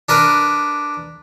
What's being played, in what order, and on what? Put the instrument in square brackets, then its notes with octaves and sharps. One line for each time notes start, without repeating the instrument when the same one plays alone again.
[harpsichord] D4 A#4 B4